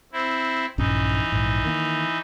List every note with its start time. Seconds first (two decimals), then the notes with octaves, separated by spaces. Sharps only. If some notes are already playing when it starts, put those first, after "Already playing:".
0.13 C4 E4
0.78 A#1 G2 E3 C#4 D#4
1.32 A#1 G#2
1.65 D#3 A#3